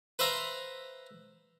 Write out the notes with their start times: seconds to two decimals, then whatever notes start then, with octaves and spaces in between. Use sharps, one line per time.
0.19 B4 C5 E5 F5 A#5